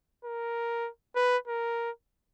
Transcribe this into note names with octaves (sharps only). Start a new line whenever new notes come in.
A#4
B4
A#4